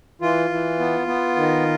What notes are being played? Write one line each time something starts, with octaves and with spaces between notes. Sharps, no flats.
E3 F4
E3
B3
B3
D#3